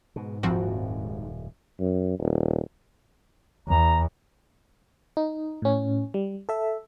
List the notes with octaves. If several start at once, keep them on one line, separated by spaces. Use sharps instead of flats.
G#2 B2
D#1 F#2 A2 F3 C4 F#4
F#2
D#1
E2 A#5
D#4
A2 C#4
G3
A4 E5